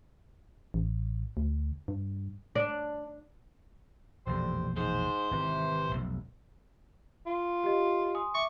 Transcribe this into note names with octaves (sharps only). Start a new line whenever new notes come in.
A1
D2
G2
D4
E1 A#1 F2 D3 G3 C5
G#2 C5
G#1 C3 E3 C4
F1 B1
F4
G4 D#5
G#5 C6 D#6
E5 C#6 D6